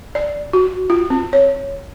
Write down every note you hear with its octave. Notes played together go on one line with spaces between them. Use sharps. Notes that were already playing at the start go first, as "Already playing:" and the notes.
D5
F#4
F4
C4
C#5